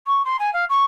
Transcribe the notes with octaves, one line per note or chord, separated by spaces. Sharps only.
C#6
C6
G#5
F5
C#6